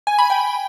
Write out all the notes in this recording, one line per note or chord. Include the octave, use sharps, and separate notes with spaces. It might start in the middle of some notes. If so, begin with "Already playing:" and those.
G#5
B5
G5